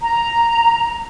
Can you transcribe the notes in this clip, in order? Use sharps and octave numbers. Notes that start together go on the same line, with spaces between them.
A#5